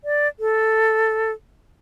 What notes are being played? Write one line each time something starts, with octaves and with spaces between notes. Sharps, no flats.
D5
A4